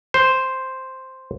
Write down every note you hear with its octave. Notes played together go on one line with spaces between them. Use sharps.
C5